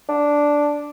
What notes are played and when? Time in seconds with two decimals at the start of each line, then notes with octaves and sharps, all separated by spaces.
0.09 D4